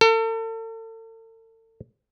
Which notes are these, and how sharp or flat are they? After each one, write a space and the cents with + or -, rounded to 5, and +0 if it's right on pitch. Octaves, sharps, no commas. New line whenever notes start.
A4 +40